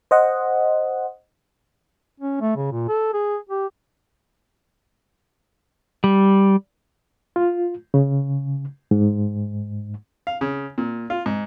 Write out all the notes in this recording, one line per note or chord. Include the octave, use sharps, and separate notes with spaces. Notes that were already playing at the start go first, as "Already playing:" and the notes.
C5 D#5 F#5
C#4
A3
C#3
A#2
A4
G#4
G4
G3
F4
C#3
G#2
F5
C#3
A#2
F4
G#2